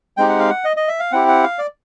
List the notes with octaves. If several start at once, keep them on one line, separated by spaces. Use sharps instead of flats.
G#3 C4 D#4 G4 G5
F#5
F5
F#5
D#5
D#5
E5
F5
C4 E4 G4 F#5
F#5
F5
D5